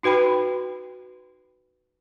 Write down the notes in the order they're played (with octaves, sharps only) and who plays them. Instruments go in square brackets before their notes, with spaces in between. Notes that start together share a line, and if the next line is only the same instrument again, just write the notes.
[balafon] D#4 F#4 B4 G5 B5